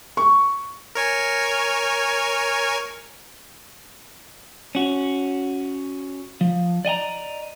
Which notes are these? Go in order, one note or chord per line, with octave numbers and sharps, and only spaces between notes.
C#6
A#4 C#5 G#5
C#4 F#4
F3
D5 D#5 G5 A#5